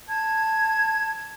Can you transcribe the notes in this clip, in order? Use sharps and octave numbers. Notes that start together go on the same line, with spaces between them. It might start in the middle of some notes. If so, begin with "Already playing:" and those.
A5 G#6